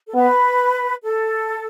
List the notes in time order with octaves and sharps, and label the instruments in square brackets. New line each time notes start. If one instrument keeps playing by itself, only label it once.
[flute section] A4
[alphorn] B3 [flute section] B4
[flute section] A4